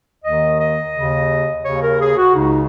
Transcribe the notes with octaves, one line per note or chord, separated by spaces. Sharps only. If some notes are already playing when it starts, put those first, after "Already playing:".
D#2 D#3 D#5
D#5
D#2 C#3
D#2 C#3 C#5
A#4
G#4
F#4
C#2 C#3 D#4